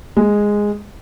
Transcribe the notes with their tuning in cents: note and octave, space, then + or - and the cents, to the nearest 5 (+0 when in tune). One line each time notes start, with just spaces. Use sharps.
G#3 -5